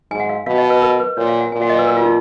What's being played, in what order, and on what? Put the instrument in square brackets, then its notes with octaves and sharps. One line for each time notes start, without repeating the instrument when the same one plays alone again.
[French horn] G#2 [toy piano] G#5
[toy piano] F#5
F5
[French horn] B2 [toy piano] F5
[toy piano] D#5
B4
A#4
B4
[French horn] A#2 [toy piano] C#5
[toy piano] F5
F#5
[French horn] A#2 [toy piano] G#5
[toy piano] F#5
D#5
B4
A#4
F4
D#4